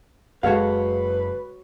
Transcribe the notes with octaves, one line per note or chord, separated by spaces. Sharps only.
F#1 G#3 F#4 A4 B4 C#5 F5